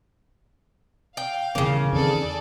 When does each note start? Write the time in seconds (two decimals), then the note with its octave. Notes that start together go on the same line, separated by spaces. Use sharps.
1.17 F5 G5
1.55 D#1 E2 C#3 A#3 C#4
1.92 E2 D#3 C4 G#4 A4 D5